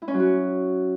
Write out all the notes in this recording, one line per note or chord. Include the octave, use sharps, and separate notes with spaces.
E4
C#4
F#3
F#4